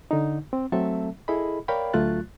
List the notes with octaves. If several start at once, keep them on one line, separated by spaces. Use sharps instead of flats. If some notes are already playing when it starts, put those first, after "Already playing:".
D3 D#4
C4
F#3 A3 C4 A4 E5 A5
E4 G#4 A4 D#5 B5
A#4 C#5 D5 F5 G5 B5
D2 F#3 A3 F4 F#6 A6